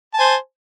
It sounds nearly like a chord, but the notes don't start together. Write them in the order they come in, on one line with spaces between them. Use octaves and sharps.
A5 G#5 C5